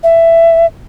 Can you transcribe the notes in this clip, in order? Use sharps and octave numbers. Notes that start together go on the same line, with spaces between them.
E5